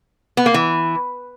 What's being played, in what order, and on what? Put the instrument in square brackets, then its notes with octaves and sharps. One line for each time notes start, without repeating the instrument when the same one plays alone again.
[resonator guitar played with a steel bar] B3
A#3
E3